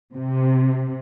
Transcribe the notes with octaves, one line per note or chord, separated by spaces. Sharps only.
C3